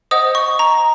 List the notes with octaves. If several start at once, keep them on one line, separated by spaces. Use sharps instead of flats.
C5 D#5 F#5 D#6
C#6
A#5